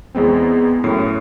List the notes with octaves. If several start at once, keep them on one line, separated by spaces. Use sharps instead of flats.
E2 G#3 B3 C4
F#2 A2 C7